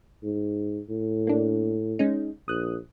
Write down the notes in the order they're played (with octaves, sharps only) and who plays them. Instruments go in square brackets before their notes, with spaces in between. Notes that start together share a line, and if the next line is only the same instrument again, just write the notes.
[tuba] G#2
A2
[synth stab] A#3 D4
G#3 C#4 D#4
[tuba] A#1 [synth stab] D#6 F#6